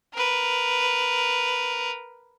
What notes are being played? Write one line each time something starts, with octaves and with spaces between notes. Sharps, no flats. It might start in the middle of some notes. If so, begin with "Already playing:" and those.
A#4 B4